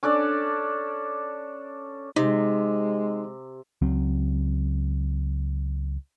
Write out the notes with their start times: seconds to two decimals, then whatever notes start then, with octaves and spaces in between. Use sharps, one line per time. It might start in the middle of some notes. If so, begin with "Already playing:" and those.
0.03 C#4 D4 A4 D5
2.16 C3 G#3 D#4
3.82 C#2 F#3 C4